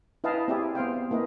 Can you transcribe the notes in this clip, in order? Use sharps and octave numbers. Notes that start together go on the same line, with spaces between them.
E4 B4 D#5 F5 G5 A5
C4 E4 G4 G#4 D5 E5
B3 C5 F5 G5
A#3 E4 B4 D#5